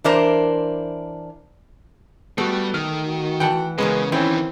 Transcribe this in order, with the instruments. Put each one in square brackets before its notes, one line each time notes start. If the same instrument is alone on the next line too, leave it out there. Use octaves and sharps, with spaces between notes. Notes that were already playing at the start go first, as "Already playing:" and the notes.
[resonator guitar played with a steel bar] E3 D4 A#4 C5
[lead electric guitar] G3 [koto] A3 [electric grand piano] B3 F#4
[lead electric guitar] D#3 [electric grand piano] F6
[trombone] F#4
[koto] E3 F#5 [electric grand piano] G5 A5
[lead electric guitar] C#3 [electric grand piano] G#3 [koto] B3 C#4 A#4 [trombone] B4
[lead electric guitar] D#3 E3 [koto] C4 [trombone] C#4 [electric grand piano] E4